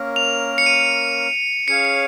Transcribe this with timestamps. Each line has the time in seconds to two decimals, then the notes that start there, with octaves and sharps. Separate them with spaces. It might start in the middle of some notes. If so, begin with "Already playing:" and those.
Already playing: A#3 C#4 A#4
0.16 F7
0.58 C#7
0.66 D#7
1.68 C#4 G#4 C#5 F5 C#7
1.85 C#7